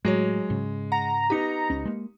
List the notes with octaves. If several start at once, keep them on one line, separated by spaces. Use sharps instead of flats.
A2 F#3 G#3 F#4 C#5
G#2 C#3
F#5 A#5 A#6
B3 D#4 G4 C#7
C#2 C#4
G#3 A#3